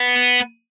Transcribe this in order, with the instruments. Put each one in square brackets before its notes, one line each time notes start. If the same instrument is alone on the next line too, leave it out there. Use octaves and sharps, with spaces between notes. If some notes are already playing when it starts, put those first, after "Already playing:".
Already playing: [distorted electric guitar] B3